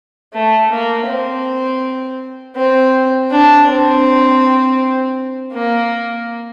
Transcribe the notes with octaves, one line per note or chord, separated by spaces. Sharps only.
A3
A#3
C4
C4
D4
C4
A#3